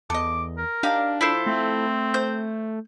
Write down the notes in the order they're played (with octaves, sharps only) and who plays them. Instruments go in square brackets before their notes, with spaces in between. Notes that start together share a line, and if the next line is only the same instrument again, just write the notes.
[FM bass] E2 [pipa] A4 D#5 [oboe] D6
[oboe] A#4
[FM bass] D4 [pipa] D#4 G4 F5
[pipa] F3 [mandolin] E4 A4 C5
[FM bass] A3 [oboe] C4
[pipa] C5 [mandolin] G6